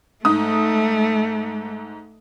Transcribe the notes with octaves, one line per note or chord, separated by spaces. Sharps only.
G#2 A3 D#6